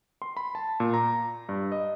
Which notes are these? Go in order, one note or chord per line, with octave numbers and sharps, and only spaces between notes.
C6
B5
A5
A#2
A#5
G2
D#5